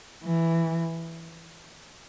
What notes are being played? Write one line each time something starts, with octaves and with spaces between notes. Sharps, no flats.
E3